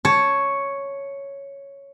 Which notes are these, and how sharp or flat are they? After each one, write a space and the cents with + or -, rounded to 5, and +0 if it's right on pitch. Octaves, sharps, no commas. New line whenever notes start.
C#5 +0 A5 +0